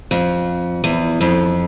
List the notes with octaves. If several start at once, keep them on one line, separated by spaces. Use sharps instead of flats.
F2
E2
F2